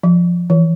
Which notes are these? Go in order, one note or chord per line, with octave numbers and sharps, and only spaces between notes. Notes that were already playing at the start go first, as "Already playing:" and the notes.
F3
E3